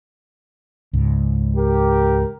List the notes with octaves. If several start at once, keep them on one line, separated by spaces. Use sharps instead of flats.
C#2 G#2
G4 A#4